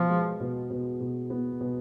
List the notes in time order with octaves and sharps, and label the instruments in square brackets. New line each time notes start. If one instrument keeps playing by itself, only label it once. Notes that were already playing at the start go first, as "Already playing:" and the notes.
Already playing: [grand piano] B2 B3 [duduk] F3
[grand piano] G#3
B2
B2
B2
B3
B2